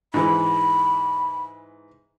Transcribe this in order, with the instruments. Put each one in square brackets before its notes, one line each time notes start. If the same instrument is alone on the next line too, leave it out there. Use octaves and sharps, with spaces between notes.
[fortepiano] G#2 E3 [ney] B5